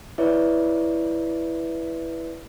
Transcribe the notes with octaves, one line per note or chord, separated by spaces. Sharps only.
E4 B4 C#5 D5 E5